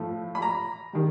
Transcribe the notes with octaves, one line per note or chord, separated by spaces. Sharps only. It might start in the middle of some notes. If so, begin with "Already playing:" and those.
Already playing: A2 F3 A3
B5
A#5
D#3 G3